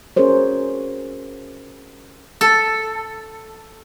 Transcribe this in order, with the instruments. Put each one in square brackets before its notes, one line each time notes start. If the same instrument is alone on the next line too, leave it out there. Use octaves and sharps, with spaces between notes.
[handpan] C#4 F#4 G#4 A#4 C5 C#5
[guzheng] A4